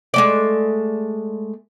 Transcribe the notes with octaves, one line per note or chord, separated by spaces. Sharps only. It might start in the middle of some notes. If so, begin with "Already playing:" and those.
G#3 A3 D5